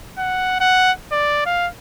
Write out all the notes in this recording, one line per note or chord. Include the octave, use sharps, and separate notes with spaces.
F#5
F#5
D5
F5